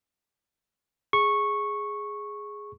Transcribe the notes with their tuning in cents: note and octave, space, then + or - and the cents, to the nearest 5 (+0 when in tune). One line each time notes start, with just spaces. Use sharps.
G#4 +0 C#6 -10